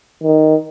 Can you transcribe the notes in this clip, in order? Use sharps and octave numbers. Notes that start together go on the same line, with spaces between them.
D#3